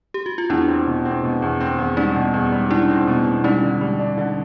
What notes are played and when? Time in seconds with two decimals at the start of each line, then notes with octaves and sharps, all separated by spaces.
0.14 G4
0.26 F#4
0.38 F4
0.50 E2 D4 E4
0.68 C4
0.87 B2
1.05 C4
1.24 B2
1.42 E2
1.60 C4
1.78 E2
1.97 G3 C#4 D#4
2.16 B2
2.34 E2
2.52 G3
2.70 G3 D4 E4
2.90 C4
3.07 B2
3.26 B2
3.44 G3 C#4 D#4
3.63 D3
3.81 G3
3.99 D4
4.18 D3